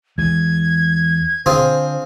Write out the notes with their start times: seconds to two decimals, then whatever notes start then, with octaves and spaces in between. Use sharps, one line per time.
0.18 E2 E3 G#3 G#6
1.46 D3 C4 F4 G#4 C5